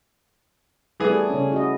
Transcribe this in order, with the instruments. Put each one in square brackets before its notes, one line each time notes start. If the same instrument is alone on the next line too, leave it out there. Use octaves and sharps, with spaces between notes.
[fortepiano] E3 B3 G#4 [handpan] G3 A3
[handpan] C#3 C#4
E4 F#4 D#5